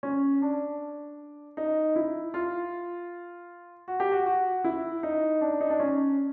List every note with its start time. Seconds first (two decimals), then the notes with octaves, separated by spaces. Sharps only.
0.03 C#4
0.42 D4
1.57 D#4
1.96 E4
2.34 F4
3.88 F#4
4.00 G4
4.12 F#4
4.26 F#4
4.64 E4
5.03 D#4
5.41 D4
5.61 D#4
5.70 D4
5.80 C#4